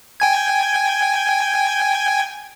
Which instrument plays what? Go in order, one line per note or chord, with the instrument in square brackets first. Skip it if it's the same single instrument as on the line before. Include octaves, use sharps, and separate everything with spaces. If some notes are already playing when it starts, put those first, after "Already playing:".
[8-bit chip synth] G5 G#5 G#6